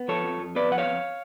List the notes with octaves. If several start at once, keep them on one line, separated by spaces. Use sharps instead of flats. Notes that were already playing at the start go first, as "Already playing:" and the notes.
Already playing: B3
F3 A4 C#5
F2
F2
B3 B4 D5
F3 F#5
C#5 F5
F2